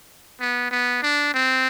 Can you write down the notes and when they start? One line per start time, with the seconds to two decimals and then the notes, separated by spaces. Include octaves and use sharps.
0.40 B3
0.71 B3
1.02 D4
1.34 C4